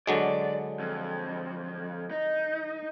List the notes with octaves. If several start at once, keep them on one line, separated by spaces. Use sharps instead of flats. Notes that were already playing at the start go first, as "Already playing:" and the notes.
D3 F#3 G#3 D5
F2
D#4